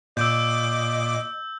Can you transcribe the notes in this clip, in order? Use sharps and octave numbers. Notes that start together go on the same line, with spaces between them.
A#2 D#5 D6 E6 G6